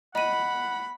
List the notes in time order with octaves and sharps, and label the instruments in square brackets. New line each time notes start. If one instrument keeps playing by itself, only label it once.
[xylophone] D#5 D#7 [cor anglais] F#5 [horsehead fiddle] B5